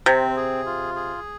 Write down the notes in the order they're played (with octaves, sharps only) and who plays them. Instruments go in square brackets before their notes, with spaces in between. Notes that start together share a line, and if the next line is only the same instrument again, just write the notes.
[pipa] C3 [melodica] C4
[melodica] G#4
F4
G#4